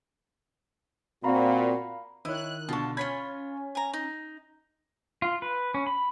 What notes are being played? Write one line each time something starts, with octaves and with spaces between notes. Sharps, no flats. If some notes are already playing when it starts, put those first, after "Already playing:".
A#2 C4 F#4 F5 A#5 B5
D#3 E4 C#5 D#5 F#6
B2 D3 F4 A5 C#6
C#4 F4 C#5 B5 G#6 B6
G#5 A#5
D#4
F4
B4
C#4
B5